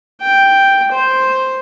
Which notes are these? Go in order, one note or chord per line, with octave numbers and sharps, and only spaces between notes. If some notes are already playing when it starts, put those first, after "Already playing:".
G5
C5